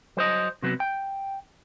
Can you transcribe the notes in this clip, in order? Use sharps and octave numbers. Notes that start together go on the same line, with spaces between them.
F#3 C5 D#5
C3 F#3 B3
G5